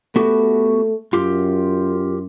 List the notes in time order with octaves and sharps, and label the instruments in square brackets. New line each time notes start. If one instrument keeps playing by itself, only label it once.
[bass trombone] A3 [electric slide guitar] B3 F#4 G4
[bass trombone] F#2 [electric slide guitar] F4 G4